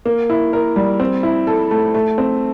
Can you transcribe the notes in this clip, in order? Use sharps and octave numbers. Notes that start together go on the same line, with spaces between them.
A#3
E4
A#4
G3
C4
E4
A4
A3
A3
C4